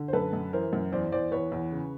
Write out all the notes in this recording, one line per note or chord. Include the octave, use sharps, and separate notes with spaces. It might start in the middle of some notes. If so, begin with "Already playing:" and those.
Already playing: D3
C5
F#2 A4 B4
F#2
E3 A#4 C5
F#2
E2 C5 D5
E2 C5 D5
E2 B4 C#5
E2
C#3